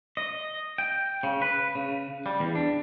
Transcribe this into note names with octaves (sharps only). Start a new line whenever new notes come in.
D#5
G5
C#3
B4
C#3
G3
E2
D4